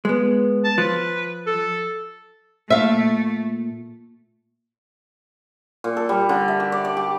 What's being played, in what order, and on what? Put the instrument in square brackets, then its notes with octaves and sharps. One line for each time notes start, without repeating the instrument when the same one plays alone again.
[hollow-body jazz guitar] G#3 B3
[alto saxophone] A5
[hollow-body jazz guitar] F3 [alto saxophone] B4
[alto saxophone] A4
[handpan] A#2 [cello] A3 [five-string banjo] E5 F5
[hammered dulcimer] A#2
A4
G3
D3
E5
G4
D5
D5
G4